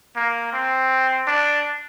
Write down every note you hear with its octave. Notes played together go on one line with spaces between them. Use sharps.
A#3
C4
D4